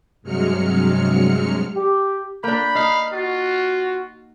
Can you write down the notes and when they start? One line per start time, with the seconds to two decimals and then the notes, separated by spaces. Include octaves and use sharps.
0.22 G2 C3 F#3 G#3 F6 C#7
1.75 G4
2.44 A#3 D4 G5 B5
2.75 D#4 F5
3.13 F4 F#4